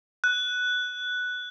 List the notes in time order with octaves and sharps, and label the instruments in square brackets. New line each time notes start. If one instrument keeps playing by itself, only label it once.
[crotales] F#6